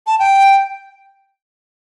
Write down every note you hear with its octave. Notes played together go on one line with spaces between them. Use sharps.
A5
G5